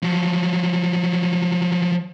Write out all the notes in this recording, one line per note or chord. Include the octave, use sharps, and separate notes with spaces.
F3 F#3